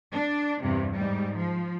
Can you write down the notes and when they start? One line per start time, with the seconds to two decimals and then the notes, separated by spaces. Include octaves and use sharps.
0.13 D4
0.63 E2 G2 C3
0.94 G#2 G3
1.38 F3